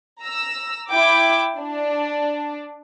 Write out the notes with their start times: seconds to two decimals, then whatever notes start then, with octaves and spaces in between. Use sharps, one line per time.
0.22 A#5 E6
0.91 E4 G5 D6
1.58 D4